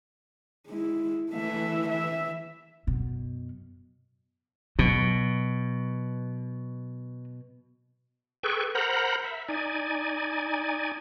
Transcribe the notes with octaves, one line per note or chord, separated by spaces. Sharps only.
G#3 E4
E3 A3 E5
E5
F#2 B2
B2 F#3
G#4 A4 B4 G5 C#6
A#4 C5 F#5 A#5 B5
E5
D#4 D5 G#5